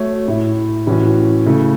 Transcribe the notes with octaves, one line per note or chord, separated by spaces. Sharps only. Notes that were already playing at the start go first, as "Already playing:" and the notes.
Already playing: A3 F#4 C#5
A2 A3 E4
A2 E3 C#4 F#4
C#3 A3 E4 A4